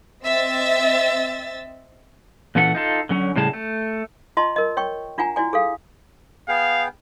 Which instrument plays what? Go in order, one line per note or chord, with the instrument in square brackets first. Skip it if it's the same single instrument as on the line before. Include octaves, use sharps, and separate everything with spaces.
[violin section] C4 D#5 E5 E6 A6
[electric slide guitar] A#2 E3 C#4 A4 F#5
D#4 F4 A4
D3 F#3 C#4
A2 C#3 G3 G#4 A5
A3
[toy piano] F4 D#5 A5 C6
A#4 D#5
C#5 G5 C#6
D4 F4 F#5 G#5 A#5
E4 F#4 D5 G#5
G#4 A4 F5
[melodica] B3 G#4 G5 [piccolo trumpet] F5